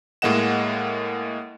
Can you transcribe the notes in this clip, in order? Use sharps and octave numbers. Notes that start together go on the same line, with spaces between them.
A2 G#3 A#3 D#5 F#5 E7